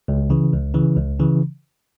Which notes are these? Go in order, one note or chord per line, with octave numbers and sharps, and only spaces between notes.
C#2
C#3 E3
C#2
C#3 E3
C#2
C#3 E3